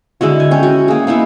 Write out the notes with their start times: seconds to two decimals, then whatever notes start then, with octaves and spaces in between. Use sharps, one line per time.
0.21 D3 G#3 E4 F#4
0.40 G#5
0.51 C#4 G5
0.63 F#4
0.88 A#3 G#4
1.07 A#3 B3 D#4 E4